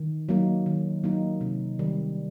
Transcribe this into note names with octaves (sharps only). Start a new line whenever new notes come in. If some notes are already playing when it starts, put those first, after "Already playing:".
Already playing: D#3
F#3 A#3 D#4
D#3
F#3 A#3 D#4
C3
D#3 G3